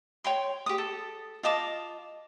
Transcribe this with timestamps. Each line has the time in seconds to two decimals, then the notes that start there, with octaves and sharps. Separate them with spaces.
0.24 C#5 G5 C6
0.66 G4 D#6
0.78 A4
1.43 F4 D#5 A5 D6